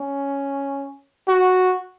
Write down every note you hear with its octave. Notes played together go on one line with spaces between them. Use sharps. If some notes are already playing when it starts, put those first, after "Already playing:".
Already playing: C#4
F#4